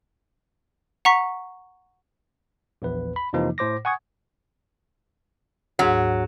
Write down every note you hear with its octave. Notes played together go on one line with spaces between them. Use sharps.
F#5 A#5 C#6 B6
A#1 E2 B4
B5
F2 C3 E3 F3 A#3 D#4
A2 C5 D6 A#6
F#5 G#5 C#6 D#6 G#6
D2 G#2 F#3